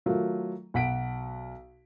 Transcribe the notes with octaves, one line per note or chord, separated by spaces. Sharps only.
D#3 F#3 A3 F4
B1 F#5 B6 D7